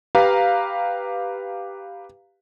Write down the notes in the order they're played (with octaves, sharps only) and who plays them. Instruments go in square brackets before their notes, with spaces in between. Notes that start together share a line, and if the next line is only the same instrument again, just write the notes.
[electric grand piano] G4 B4 F5 A#5